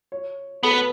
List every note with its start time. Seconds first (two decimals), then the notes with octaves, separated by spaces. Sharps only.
0.12 C#5
0.63 B3 A4
0.71 B4